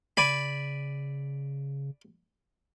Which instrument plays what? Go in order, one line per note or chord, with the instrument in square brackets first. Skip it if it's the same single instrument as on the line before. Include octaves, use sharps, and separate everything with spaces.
[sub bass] C#3 [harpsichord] D5 G#5 B5